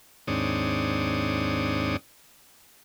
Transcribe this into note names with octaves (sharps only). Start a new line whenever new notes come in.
D#2 G#2 C4 D4 C#5 D#6